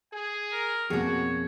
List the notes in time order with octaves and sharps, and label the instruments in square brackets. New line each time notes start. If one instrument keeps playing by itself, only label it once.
[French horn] G#4 [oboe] G#5
[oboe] A#4
[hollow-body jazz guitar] F2 B2 [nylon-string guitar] A#3 G#4 [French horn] F#4 [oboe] C#5